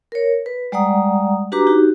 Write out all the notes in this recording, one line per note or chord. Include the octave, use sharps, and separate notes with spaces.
A#4 C#5
B4
G3 G#3 D5 F#5 A#5 D#6
D4 F#4 G4 B4 A#5 D6
D#4 F#4 G4